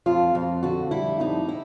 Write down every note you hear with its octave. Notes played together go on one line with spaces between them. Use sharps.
F2 F4
F2
D3 F#4
G3 E4
F2 D#4
E4